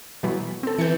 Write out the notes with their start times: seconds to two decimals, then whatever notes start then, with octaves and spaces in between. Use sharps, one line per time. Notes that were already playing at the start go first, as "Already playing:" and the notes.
0.23 B2 E3 F#3
0.63 C4 A4
0.78 E3 G6 A6 C#7